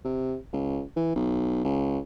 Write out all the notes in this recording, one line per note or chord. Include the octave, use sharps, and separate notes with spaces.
C3
C#2
E3
B1
C#2